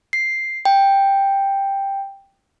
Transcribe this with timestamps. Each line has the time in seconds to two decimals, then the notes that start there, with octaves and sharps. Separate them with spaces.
0.13 C7
0.65 G5